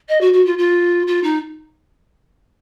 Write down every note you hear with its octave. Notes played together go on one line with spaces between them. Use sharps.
D#5
F#4
F#4
F4
F4
F4
D#4